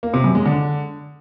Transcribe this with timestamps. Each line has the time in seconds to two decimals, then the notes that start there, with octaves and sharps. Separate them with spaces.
0.03 A#3
0.14 C3
0.24 F#2
0.35 G#3
0.45 D3